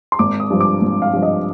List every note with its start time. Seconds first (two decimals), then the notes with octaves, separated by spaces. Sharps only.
0.12 C6
0.19 G#1 D6
0.40 D#6
0.50 G2 F3
0.60 D6
0.82 G#1
1.02 F5
1.13 G2 F3
1.23 D#5